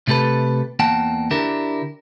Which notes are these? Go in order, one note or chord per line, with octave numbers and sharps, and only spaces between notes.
C3 A3 G4 A4 B4
E2 A#3 F#5 G5 A5
D3 D4 E4 G4 A#4